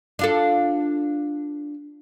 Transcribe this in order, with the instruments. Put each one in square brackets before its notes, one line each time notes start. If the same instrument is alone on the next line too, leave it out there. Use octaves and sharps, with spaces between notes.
[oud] D4 F4 A4